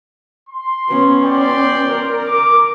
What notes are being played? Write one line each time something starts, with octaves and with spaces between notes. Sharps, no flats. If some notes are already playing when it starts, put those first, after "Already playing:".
C6
B3 C#4
D5 G5 C6
A#4
D6